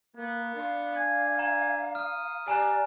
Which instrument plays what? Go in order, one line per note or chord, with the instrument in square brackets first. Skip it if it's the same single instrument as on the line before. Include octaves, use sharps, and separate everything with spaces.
[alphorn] A#3 [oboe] B3
[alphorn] D4 [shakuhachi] F5
[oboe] G#5
[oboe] G#5 [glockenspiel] A#5
[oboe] D#6 [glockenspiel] F6
[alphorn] G4 [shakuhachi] D5 [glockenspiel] G#5 A#5 F#6